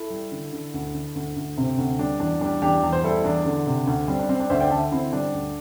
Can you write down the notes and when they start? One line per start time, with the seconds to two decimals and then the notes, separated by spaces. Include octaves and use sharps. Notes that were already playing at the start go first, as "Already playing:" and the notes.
Already playing: E4 A4
0.10 G3
0.31 D3
0.52 D3
0.74 D2
0.94 D3
1.15 D2
1.36 D2
1.57 C3 C4
1.78 D2
1.98 G3 D4
2.20 E2 D4
2.41 G3 D4
2.62 E2 D4 G4
2.83 E2
2.93 C5
3.03 G3 E4 A4
3.24 E2 D4
3.46 D3
3.67 C3
3.87 D2
4.08 G3 C4
4.19 D4
4.29 G3 C4
4.40 D4
4.50 D2 C5 E5
4.60 D5 G5
4.71 D3 E5 A5
4.92 D3 C4 E4
5.13 G3 D4
5.34 D2